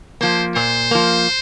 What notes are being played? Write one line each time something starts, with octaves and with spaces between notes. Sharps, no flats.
F3 A#3 C5
A#2 C5
F3 A#3